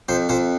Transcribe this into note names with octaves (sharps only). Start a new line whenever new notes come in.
F2 C5
F2 C5